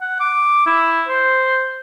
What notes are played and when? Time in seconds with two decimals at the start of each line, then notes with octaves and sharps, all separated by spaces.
0.01 F#5
0.20 D6
0.66 E4
1.08 C5